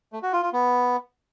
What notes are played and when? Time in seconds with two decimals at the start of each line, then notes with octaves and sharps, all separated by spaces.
0.13 A3
0.23 F#4
0.33 F4
0.43 F4
0.53 B3